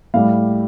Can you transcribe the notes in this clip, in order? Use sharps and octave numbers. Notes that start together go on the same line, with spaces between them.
A2 G3 F5